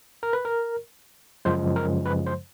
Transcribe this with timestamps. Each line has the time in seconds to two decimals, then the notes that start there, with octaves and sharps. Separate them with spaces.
0.23 A#4
0.33 B4
0.45 A#4
1.45 F#2 C#3 F3 G#3 C5
1.76 A#4
2.06 B4
2.27 C5